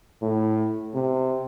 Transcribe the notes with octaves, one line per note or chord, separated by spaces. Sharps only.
A2
C3